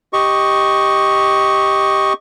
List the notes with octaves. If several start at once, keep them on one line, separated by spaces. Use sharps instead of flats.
G4 D#5 C#6